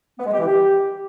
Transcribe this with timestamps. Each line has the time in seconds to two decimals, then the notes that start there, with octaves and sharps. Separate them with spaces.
0.19 B3
0.26 G#3
0.33 G4
0.40 E3
0.46 G4